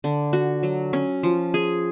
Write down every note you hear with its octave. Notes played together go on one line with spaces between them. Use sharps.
D3
F#4
F#3
C#4
F3
G#4